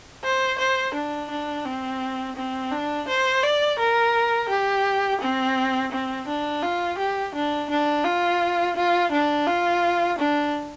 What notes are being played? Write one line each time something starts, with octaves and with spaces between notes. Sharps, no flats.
C5
C5
D4
D4
C4
C4
D4
C5
D5
A#4
G4
C4
C4
D4
F4
G4
D4
D4
F4
F4
D4
F4
D4